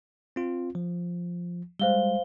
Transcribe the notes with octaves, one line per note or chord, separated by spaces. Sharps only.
C4 F4
F3
G3 G#3 C5 F5 G7